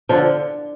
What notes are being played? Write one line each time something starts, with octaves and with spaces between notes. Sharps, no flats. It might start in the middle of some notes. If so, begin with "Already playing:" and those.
D3 F3